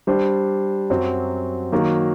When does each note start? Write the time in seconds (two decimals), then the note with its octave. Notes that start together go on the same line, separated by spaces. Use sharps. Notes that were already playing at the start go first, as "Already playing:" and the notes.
0.07 G3 D4 G4 C5
0.90 F#2 F#3 C4
1.72 D#3 F#3 A#3 F#4